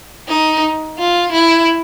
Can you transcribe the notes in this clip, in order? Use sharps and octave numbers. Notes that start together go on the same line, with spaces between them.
D#4
F4
E4